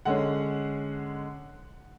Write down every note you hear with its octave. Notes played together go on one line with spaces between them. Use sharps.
D3 G#3 C#4 F#5